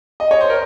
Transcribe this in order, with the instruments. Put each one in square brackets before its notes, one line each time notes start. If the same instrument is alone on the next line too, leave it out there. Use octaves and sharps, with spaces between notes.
[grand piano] D#5
C#5
C5
A#4